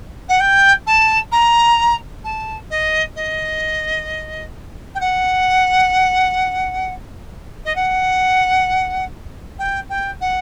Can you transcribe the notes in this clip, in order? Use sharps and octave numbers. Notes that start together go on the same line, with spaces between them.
F#5
G5
A5
A#5
A5
D#5
D#5
G5
F#5
D#5
F#5
G5
G5
F#5